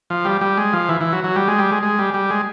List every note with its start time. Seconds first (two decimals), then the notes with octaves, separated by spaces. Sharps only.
0.10 F3
0.25 G3
0.41 G3
0.57 G#3
0.73 F3
0.89 E3
1.01 E3
1.12 F#3
1.24 F#3
1.36 G3
1.48 G#3
1.58 G3
1.71 G#3
1.83 G#3
1.99 G3
2.14 G3
2.30 G#3